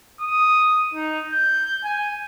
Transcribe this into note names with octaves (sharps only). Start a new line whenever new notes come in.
D#6
D#4
G6
G#5